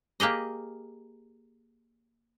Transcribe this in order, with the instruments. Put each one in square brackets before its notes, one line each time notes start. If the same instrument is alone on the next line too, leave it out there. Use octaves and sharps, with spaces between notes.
[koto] A#3 G4 G#4 D#5